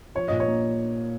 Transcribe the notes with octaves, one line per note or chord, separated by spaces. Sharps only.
F3 C#5
A#2 D#5
C#5
A#3